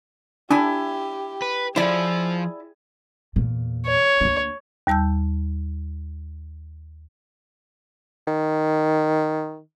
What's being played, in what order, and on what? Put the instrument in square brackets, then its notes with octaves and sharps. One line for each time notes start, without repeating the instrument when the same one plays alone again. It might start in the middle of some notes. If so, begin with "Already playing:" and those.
[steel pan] D4 [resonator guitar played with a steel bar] E4 G#5 [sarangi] G4
[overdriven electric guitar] B4
[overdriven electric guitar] F3 C5 [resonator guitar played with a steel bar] E4 D5 [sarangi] G#4
[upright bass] E2 A#2
[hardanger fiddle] C#5
[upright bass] D2 A#3
[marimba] D#2 G3 A5 E6 G6
[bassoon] D#3